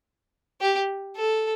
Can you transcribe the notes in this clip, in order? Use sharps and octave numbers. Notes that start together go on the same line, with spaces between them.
G4
A4